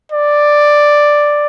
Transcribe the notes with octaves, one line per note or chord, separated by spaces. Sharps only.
D5